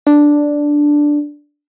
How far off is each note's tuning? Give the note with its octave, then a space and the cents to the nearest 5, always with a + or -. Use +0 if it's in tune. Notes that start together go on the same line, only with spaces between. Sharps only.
D4 +0